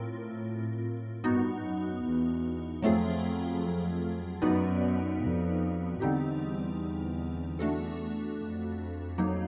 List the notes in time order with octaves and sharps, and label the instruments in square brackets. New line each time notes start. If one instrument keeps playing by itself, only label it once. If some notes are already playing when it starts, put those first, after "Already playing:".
Already playing: [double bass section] A2 [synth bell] C4 F4 A#4
[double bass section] G2 [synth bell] B3 D#4 F#4
[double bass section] F#2
E2
[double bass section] F2 [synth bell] F#3 A3 C4 F4 G#4
[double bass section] F#2 [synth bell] B3 D#4 F#4 B4 D5
[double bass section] F2
[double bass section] E2 [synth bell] D3 G3 C4 D#4 G4
[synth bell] A3 D4 F#4 A4
[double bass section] F2
[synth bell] F#3 A#3 D#4